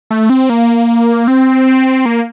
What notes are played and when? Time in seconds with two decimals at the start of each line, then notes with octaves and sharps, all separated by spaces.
0.11 A3
0.30 C4
0.50 A#3
1.28 C4
2.06 A#3